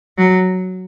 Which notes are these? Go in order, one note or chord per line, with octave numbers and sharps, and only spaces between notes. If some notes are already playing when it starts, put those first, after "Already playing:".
F#3